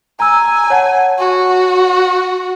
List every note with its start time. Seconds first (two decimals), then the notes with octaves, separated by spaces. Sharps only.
0.20 G#5 A#5 E6
0.70 C#5 F#5 A5
1.19 F#4